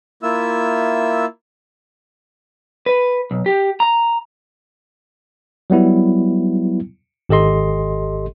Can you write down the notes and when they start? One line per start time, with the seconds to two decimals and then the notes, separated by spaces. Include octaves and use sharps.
0.23 A#3 E4 F4 E5 E6
2.86 B4
3.31 B1
3.46 G4
3.80 A#5
5.70 F#3 G3 B3 E4
7.29 G#1 G4 A4 D#5 C6